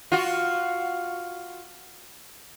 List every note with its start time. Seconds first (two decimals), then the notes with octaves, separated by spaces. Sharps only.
0.12 F4 F#4